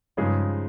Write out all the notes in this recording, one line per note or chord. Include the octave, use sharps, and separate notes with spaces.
G2 C#3 F3 G#3 D#4 G#4